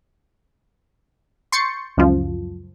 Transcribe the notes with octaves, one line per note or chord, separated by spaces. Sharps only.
C6 C#6 G6 A6 C#7
C#2 F#2 F3